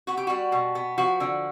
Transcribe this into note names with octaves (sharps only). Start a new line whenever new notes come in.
B3 F#4
G4
G3 F#4
B2
B3
F3 F#4
D3